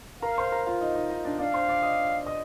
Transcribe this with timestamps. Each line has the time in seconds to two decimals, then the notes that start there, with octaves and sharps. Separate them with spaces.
0.22 A#4 F5 A#5
0.38 C5 C6
0.52 A#4 A#5
0.66 F4 F5
0.81 D#4 D#5
0.95 D#4 D#5
1.10 D#4 D#5
1.24 D4 D5
1.39 D4 D5 F5
1.54 C5 C6
1.69 D5 D6
1.83 D#5 D#6
2.26 D#5 D#6